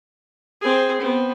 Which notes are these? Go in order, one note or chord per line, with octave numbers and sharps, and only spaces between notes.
C4 G#4
B3 C4